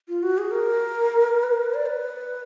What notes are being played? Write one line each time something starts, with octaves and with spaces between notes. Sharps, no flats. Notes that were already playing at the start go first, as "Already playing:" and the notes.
F4
F#4
G#4
A#4
B4
A#4
B4
D5
B4